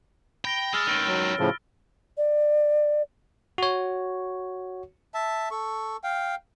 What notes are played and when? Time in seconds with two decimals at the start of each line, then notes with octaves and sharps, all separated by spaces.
0.45 G5 B5 A#6 G7
0.73 G#3 E6 F6 A6
0.87 C#2 D#3 F6 D7 G7
1.07 F#3
1.39 A2 C#3 F3
2.18 D5
3.58 F#4 C#5
5.14 E5 A5
5.51 A4 C#6
6.04 F5 G5